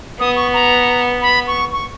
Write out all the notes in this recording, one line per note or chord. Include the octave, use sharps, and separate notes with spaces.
B3 D#6
C#6
A#5
B5
C#6
C#6